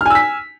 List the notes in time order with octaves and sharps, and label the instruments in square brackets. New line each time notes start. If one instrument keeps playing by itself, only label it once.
[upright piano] F6
G#5
E6
B6